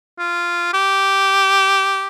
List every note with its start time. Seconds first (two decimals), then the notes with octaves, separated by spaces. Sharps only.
0.19 F4
0.73 G4